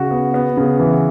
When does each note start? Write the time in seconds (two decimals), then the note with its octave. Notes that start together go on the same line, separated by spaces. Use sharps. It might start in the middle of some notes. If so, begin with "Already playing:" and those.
Already playing: C#3 F#4
0.11 B3
0.34 B3
0.57 C#3
0.80 E3